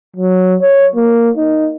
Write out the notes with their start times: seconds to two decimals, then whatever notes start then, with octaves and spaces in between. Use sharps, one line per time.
0.16 F#3
0.62 C#5
0.96 A#3
1.37 D#4